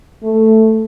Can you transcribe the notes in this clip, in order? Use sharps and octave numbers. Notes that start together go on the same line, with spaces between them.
A3